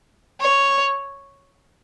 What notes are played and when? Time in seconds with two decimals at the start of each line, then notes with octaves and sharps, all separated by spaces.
0.41 C#5